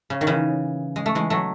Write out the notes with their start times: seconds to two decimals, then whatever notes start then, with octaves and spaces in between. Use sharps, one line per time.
0.10 C#3
0.21 D#3
0.27 C#3 E3
0.96 G#3
1.06 A3
1.15 E3 G#3
1.30 F#3 A3